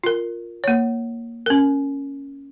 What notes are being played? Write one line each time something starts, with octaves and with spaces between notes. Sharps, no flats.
F4 A#4
A#3 C#5
C#4 A#4